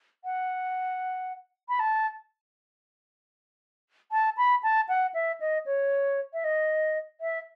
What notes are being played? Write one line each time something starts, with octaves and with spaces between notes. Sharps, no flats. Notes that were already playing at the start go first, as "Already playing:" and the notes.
F#5
B5
A5
A5
B5
A5
F#5
E5
D#5
C#5
E5
D#5
E5